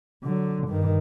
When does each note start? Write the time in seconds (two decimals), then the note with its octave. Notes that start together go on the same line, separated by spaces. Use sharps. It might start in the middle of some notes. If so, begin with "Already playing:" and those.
0.23 D3 F#3
0.67 G2 D#3